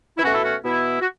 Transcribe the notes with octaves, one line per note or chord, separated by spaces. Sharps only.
E4
B2 A3 C#4 F#4
E4 A4
C#4 F#4
B2 B3 E4
F#4